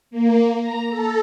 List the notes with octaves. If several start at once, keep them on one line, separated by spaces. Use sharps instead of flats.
A#3
A#5
A4